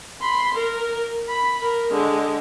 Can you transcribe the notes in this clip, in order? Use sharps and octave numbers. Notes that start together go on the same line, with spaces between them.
B5 C6
A#4
B5
A#4
D3 G#3